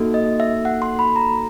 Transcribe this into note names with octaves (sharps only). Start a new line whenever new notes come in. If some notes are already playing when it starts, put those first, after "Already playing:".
Already playing: A#3 D#4 F#4 A4
D#5
E5
F#5
C6
B5
A#5